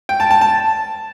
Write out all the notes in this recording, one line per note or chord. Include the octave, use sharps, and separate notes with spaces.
G5
A5
A5
A5